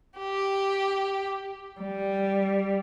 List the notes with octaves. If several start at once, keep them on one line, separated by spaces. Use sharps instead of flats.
G4
G3